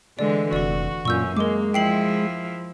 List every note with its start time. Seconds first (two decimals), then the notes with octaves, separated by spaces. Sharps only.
0.19 D3 E3 G#3 D5
0.53 F1 F#4 D5 C#6
1.05 F#2 A#2 C#4 C#6 E6 G6
1.37 G#3 A#3 A#4 D6
1.74 F3 E4 G5 C7 F#7